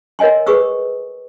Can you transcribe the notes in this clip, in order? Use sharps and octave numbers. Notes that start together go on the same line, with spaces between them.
A#4 C#5 D#5 G#5 C6
G#4 B4 C#6 D#6 E6